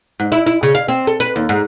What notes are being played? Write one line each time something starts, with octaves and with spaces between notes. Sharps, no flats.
G#2
E4
E4
C#3
F5
C4
A4
B4
D#2
G#2